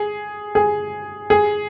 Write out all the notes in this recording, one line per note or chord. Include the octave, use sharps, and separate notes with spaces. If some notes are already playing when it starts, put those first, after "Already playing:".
Already playing: G#4
G#4
G#4